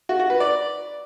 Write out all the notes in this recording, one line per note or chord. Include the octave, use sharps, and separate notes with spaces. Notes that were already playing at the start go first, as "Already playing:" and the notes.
F#4
F#4
B4
D5